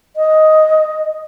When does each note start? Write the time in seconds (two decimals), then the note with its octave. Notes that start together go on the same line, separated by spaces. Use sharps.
0.16 D#5